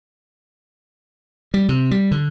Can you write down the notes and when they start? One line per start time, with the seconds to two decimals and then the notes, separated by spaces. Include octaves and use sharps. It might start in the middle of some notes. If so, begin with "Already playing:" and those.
1.54 G3
1.69 C3
1.91 G3
2.11 D3